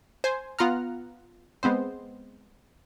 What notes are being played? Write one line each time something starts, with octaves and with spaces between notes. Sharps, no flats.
C5 G#5
B3 F4 F#5 A#5 F6
G#3 B3 C4 C5